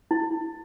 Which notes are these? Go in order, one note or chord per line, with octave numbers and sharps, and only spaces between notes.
E4